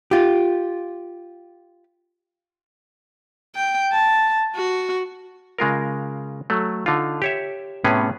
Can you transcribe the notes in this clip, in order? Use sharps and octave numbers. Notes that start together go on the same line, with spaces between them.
F4 G4
G5
A5
F#4
C#3 G#3 F4 A#4
F#3 A3
D3 D#4 F4
G4 C#5 E5
A2 C3 B3 C#4 G#4